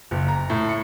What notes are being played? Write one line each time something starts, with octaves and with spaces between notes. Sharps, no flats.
F#1
A#5
A2
C#7